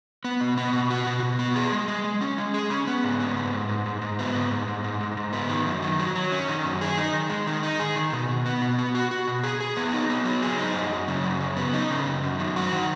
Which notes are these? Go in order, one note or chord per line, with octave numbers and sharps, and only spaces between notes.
B3
B2
B3
B2
F#4
B2
B2
B3
G#4
G#3
G#3
G#3
C#4
G#3
G#4
C#4
B3
G#2
B3
G#2
G#2
G#2
G#2
G#2
B3
G#2
G#2
G#2
G#2
G#2
G#2
B3
D#3
F#2
D#3
F#3
F#3
C#4
D#3
F#2
G#4
D#4
D#3
G#3
D#3
D#4
G#4
D#3
B2
B2
B3
B2
B3
F#4
F#4
B2
G#4
G#4
B3
D#4
B3
F#3
G#4
D#4
F#2
F#2
C#3
F#2
C#3
B3
D#4
C#3
F#2
F#2
D#3
F#4
D#3